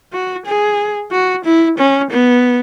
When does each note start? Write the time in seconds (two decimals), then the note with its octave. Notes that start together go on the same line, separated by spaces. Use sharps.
0.13 F#4
0.46 G#4
1.12 F#4
1.44 E4
1.78 C#4
2.10 B3